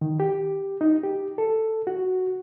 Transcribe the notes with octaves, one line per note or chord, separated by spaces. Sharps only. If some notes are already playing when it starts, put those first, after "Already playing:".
D#3
G4
D#4
G4
A4
F#4